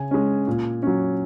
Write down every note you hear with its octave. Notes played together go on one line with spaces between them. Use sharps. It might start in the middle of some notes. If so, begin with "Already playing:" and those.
Already playing: C#3 G#5
G#3 C#4
A#2
F#3 C#4